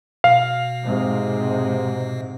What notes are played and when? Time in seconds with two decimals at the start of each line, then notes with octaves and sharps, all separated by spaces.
0.24 B2 F5
0.83 G#2 C3